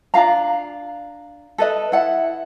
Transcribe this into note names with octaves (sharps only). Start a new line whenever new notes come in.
D4 F4 F5 A#5
A4 B4 D#5
E4 F#5